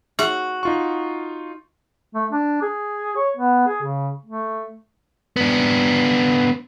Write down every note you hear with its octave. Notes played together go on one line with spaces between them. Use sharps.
F#4 G#4 E5
D#4 F4 C#6
A3
D4
G#4
C#5
B3
G#4
C#3
A3
B3 D4